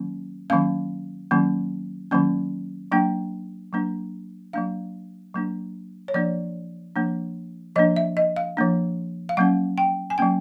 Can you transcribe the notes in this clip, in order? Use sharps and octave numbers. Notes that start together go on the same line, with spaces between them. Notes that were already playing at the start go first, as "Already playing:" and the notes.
Already playing: D#3 F#3 A#3 C#4
D#3 F#3 A#3 C#4 F5
D#3 F#3 A#3 C#4
D#3 F#3 A#3 C#4
F#3 A#3 D4 G5
F#3 A#3 D4
F#3 A#3 D4 F5
F#3 A#3 D4
C#5
F3 A#3 D4 D5
F3 A#3 D4
F3 A#3 D4 D#5
E5
D#5
F5
F3 A#3 D4
F5
F#3 A#3 C#4 F#5
G5
G#5
F#3 A#3 C#4 G5